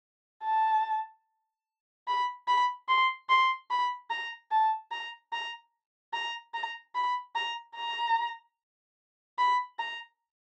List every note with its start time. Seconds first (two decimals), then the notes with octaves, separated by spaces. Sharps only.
0.45 A5
2.08 B5
2.48 B5
2.88 C6
3.29 C6
3.70 B5
4.10 A#5
4.51 A5
4.91 A#5
5.33 A#5
6.13 A#5
6.54 A#5
6.95 B5
7.35 A#5
7.76 A#5
9.38 B5
9.79 A#5